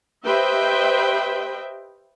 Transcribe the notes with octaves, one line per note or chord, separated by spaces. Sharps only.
G4 B4 C5 D#5 E5 G5